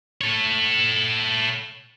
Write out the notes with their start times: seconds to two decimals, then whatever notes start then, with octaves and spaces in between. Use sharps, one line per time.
0.21 A4 C#5